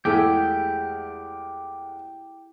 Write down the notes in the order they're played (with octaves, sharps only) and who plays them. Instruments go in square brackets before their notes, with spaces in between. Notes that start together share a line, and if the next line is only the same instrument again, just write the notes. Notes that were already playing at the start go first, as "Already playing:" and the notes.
[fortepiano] E2 G#3 A3 [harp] E4 G#4 B6 [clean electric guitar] G4